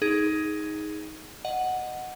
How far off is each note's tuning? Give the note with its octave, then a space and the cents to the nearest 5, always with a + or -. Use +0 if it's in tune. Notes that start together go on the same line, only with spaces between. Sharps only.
D#4 +15 G#4 +5
D#5 -10 F#5 +0